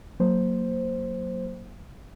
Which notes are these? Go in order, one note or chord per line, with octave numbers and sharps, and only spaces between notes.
F#3 A#3 C5